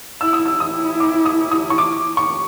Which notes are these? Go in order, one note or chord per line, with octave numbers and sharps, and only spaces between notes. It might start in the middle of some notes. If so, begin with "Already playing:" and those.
E4 E6
D#6
E6
E4 D#6
D6
D#6
D#6
C#6
D6
C#6